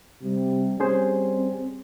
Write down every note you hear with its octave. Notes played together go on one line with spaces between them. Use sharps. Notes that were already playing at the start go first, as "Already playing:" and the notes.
C3 G3
G3 C4 C#4 G#4 C5